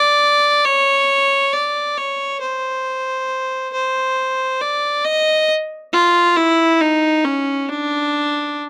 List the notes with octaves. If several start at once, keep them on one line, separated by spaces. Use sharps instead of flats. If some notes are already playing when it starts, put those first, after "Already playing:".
Already playing: D5
C#5
D5
C#5
C5
C5
D5
D#5
F4
E4
D#4
C#4
D4